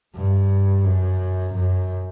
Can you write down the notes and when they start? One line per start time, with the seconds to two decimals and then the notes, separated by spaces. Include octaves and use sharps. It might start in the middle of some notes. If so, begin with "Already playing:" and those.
0.15 G2
0.85 F#2
1.55 F#2